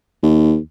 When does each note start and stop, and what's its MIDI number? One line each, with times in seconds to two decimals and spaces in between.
0.23 0.57 39